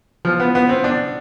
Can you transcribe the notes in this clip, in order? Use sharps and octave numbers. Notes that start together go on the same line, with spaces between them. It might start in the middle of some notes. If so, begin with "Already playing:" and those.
F3
B3
B3
C4
D4